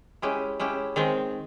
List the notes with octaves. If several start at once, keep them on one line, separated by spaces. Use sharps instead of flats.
G#3 C#4 E4 G4
G#3 C#4 E4 G4
D#3 G#3 C4